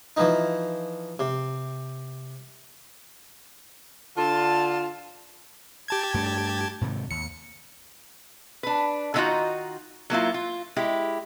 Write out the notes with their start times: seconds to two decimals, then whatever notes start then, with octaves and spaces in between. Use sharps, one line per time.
0.17 E3 F3 D#4
1.19 C3
4.17 D3 F4 A5
5.88 G4 A5 G#6
6.14 G2 A3 D4
6.81 G#2 C3 D#3
7.11 D#2 C#7
8.63 D4 B4
9.14 D3 D#3 G#3 D#4 F4 F#4
10.10 F#3 A#3 E4 F4
10.34 F4
10.76 G#3 E4 G4